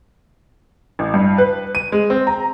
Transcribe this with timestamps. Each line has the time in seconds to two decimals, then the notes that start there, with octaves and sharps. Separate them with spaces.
0.99 A1
1.14 G2
1.38 B4
1.75 D#7
1.92 G#3
2.10 C4
2.27 A#5